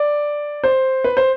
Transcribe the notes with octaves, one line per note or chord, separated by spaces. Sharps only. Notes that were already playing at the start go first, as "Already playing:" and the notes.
Already playing: D5
C5
B4
C5